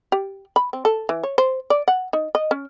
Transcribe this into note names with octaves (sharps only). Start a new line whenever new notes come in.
G4
B5
C4
A4
E3
C#5
C5
D5
F#5
D#4
D#5
C#4